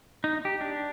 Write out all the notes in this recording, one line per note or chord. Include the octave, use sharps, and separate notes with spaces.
D#4
G4
D4